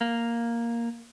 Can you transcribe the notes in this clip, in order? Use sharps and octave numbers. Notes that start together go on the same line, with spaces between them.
A#3